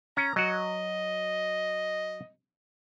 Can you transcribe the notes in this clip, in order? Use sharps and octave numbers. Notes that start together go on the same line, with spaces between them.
C#4 A#5
F#3 F#4 D#5